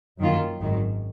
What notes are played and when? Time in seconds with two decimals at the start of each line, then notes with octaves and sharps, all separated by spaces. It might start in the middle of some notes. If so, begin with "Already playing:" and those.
0.19 F#2 D#3 A#3 F4
0.61 G#1 F#2 D#3